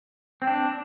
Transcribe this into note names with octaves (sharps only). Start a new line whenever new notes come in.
C4
D4